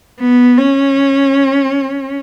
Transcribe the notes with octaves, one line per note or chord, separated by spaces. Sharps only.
B3
C#4